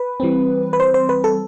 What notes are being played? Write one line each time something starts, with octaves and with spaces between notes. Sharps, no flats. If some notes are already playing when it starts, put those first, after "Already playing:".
Already playing: B4
E3 G3 C4
B4
C5
C5
B4
A4